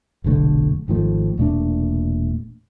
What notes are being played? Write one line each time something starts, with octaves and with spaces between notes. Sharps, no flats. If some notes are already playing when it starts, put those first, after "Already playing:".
F1 B1 D3 A3
G#1 D#3 F3 A3
E1 A#2 A3 D4